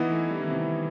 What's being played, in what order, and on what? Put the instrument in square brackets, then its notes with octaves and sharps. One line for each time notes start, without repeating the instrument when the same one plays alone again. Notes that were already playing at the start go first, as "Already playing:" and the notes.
Already playing: [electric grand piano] E3 B3 E4 [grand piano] D#4
[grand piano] A3
G3
D#3
C3